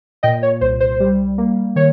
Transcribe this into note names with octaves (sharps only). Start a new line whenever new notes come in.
A#2 D#5 G5
C#5
C2 C5
C5
G3
A#3
D#3 C#5